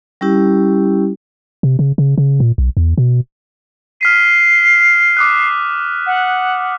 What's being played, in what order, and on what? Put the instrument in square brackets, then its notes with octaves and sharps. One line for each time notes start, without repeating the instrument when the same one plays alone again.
[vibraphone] G3 C#4 E4 G4
[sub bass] C3
C#3
C#3
C#3
A#2
B1
E2
B2
[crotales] F6 B6 D#7 [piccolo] C7
[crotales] D6 D#6 F#6
[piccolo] F#5